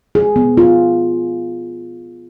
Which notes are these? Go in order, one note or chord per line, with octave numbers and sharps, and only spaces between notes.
G#4
B3
F4